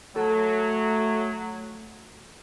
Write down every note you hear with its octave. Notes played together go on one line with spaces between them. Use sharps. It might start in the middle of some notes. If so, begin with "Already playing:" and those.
F#3 A3 A4